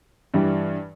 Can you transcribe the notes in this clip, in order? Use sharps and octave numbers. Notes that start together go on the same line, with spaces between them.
G2 E3 G3